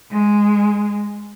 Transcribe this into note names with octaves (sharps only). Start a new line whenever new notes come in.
G#3